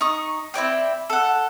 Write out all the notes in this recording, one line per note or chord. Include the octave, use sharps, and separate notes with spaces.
D#4 C#6 D#6
C4 E4 D5 G5
A4 F#5